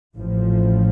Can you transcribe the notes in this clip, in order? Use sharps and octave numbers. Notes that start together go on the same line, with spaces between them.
A1 A2 F3